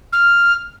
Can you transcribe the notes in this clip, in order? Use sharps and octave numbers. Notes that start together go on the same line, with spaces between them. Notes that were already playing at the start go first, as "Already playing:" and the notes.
F6